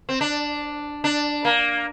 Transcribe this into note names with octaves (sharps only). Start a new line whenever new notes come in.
C4
D4
D4
A#3